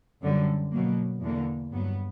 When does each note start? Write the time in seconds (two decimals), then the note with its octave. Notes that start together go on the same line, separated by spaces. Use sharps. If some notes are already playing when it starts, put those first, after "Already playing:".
0.22 F#2 D3 G3
0.71 B2 F#3 A#3
1.21 E2 D3 A#3
1.71 G2 F#3 B3